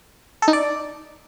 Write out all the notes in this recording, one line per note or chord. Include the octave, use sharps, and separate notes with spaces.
A4
D#4
D5